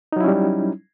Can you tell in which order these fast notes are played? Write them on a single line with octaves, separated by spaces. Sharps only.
D#4 F#3 E4 C#4 G3